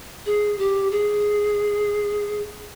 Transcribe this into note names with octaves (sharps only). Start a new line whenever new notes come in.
G#4
G4
G#4